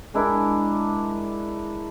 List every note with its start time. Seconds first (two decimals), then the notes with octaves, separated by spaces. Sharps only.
0.14 G#3 D4 E4 A#4